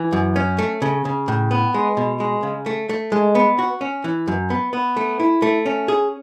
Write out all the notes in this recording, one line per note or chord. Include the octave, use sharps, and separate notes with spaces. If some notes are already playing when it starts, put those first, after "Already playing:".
Already playing: E3
F#2
C#4
A3
C#3
C#3
A2
B3
G#3
B2
G#3
C#3
A3
A3
G#3
B3
F#4
C#4
E3
F#2
B3
B3
A3
E4
A3
C#4
G#4